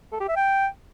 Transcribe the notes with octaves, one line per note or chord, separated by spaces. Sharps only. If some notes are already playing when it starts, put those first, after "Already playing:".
A4
G4
E5
G5